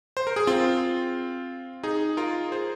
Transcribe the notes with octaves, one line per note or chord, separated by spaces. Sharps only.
C5
A#4
G#4
C4 F4
D#4 G#4
F4 A#4
G#4 C5